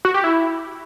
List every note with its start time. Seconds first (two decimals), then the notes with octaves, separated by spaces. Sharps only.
0.05 F#4
0.14 G4
0.24 E4